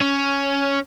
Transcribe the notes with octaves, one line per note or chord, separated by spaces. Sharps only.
C#4